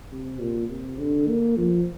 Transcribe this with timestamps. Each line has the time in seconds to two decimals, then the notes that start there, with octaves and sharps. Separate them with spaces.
0.12 C3
0.40 A#2
0.69 C3
0.98 D3
1.27 A#3
1.56 F3